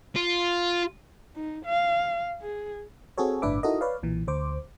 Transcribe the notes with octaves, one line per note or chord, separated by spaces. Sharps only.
F4
D#4
F5
G#4
C4 F#4 G#4 A4 C#5
G1 A2 D4 B4 E5 D6
D#4 E4 F#4 A4 A#4 D#5
B4 C#5 D5 F5
B1 A#2 E3
D2 C5 D6